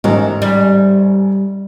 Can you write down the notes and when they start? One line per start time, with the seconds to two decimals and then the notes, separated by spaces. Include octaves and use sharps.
0.04 A1 G#2 D#3
0.42 G3